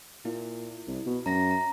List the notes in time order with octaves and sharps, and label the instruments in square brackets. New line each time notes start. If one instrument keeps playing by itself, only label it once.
[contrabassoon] A#2 [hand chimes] E4
[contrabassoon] C2
B2
[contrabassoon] F#2 [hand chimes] A#5 A#6
[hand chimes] A#5